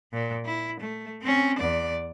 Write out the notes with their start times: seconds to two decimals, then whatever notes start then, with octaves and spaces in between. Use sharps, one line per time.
0.13 A#2
0.45 E4
0.81 A3
1.22 C4 C#4
1.59 E2 D5